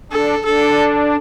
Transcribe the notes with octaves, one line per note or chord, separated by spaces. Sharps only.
D4 A4
D4 A4